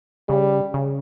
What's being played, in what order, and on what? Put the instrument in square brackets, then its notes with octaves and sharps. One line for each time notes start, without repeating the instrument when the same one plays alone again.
[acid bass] C#3 [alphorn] G3
[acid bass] C#3